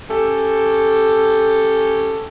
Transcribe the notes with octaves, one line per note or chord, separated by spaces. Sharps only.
C#4 G4 A4